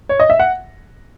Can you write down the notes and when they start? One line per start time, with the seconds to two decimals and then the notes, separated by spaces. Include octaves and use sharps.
0.09 C#5
0.20 D#5
0.30 E5
0.40 F#5